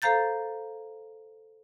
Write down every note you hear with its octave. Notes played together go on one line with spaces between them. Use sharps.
A4 C5 F5 A#5 G6 A6